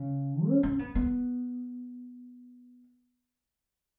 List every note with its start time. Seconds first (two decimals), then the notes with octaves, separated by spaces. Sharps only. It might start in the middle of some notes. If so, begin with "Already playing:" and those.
Already playing: C#3
0.48 C#4
0.63 C#4
0.79 B3
0.95 B3